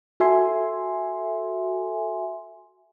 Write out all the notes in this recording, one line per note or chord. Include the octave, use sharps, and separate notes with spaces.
F#4 A4 E5 G#5 C6